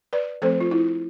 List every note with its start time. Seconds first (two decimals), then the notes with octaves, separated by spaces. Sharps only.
0.13 B4 D5
0.42 F3 A3 C4 A4 C5
0.60 F4
0.71 E4